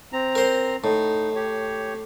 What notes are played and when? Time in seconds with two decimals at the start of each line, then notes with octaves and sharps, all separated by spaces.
0.13 C4 A#5
0.35 A#4 C5
0.84 A2 D#4
1.36 G4 C#5